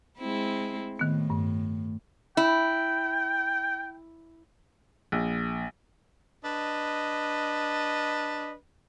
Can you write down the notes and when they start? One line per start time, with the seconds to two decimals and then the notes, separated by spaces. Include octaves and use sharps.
0.18 G#3 C4 E4
0.99 A2 D#3 B3
1.30 G2
2.37 E4 G5
5.12 A#1
6.45 D4 B4 D#5